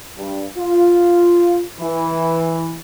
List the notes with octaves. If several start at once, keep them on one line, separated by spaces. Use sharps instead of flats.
G2
F4
E3